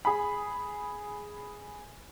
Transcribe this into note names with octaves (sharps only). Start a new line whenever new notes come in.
G#4 B5